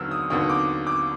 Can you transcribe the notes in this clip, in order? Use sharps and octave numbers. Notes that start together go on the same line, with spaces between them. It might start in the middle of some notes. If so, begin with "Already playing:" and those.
Already playing: D#2 D3 F#3 B3 E6 F6
D#6
D#2 D3 F#3 B3 D#6
D6
D6